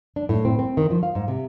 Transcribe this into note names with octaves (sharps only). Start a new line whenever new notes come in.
D4
A2
C4
C4
D#3
F3
F5
G#2
C3